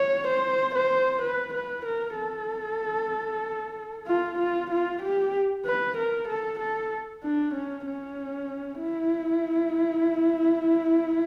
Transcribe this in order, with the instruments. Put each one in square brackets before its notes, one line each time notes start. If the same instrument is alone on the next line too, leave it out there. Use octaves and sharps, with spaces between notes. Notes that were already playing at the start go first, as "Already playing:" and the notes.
Already playing: [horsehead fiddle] C#5
C5
C5
B4
B4
A#4
A4
F4
F4
F4
G4
B4
A#4
A4
A4
D4
C#4
C#4
E4